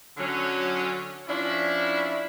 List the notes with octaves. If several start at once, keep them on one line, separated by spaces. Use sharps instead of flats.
D3 F#3 C#4
F3 C#4 D4 E4